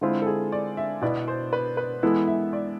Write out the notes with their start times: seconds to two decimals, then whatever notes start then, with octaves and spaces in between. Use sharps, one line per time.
0.01 D3 G#3 C4 E4 F4
0.22 A4
0.27 G#4
0.52 D5
0.77 E5
1.02 B2 B3 E4 D5
1.28 C5
1.53 B4
1.77 B4
2.03 E3 G#3 B3 E4 A4
2.28 E5
2.53 D5